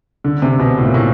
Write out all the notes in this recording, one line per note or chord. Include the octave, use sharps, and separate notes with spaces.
D3
C3
B2
A2
A#2
A2